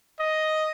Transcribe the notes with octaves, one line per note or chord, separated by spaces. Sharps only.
D#5